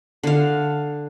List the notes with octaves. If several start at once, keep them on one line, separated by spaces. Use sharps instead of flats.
D3 F5